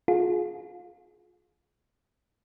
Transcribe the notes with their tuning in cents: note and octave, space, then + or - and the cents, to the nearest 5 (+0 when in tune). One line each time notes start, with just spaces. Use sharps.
F4 +30 G#4 +20